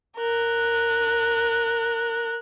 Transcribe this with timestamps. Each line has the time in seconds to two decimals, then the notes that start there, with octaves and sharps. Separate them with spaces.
0.18 A#4 F#6